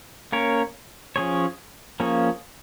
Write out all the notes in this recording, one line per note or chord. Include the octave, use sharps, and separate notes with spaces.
A#3 C#4 A#4 C#5
F3 C#4 G#4 C#5
F3 A#3 C#4 G#4 C#5